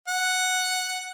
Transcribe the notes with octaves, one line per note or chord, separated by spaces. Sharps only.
F#5